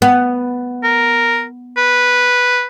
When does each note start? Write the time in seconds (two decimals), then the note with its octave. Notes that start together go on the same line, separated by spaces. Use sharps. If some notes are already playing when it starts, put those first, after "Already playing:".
0.02 B3
0.83 A#4
1.77 B4